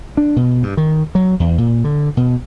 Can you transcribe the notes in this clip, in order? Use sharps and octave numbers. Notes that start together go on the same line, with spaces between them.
D4
B2
G2
D#3
F#3
E2
A#2
D3
B2